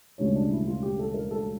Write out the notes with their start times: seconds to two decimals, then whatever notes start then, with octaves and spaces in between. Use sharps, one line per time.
0.18 E1 D2 C#3 G3 C#5
0.35 D4
0.51 E4
0.67 F4
0.83 G4
0.99 A4
1.14 A#4
1.31 A4